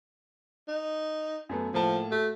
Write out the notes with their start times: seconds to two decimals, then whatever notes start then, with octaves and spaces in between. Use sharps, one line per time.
0.68 D#4
1.49 F#2 A3 B3
1.74 A2 F3 A#3 A5
2.11 A3 F#4